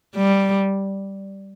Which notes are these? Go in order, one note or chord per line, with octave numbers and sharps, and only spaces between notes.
G3